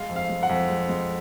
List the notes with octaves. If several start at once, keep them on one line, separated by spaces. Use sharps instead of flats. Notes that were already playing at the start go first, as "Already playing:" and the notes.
Already playing: G#3 F5
F2
F5
G#3
F#5
F2
G#3
G#3